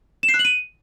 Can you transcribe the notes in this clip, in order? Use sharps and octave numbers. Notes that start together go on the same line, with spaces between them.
E7
C7
F#6
F#7
D#7